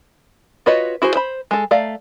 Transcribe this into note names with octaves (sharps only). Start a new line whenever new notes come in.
F4 F#4 B4 C#5 D#5
E4 F#4 G#4 C5
C5 B5
G#3 A4
A3 D5 F5 A#5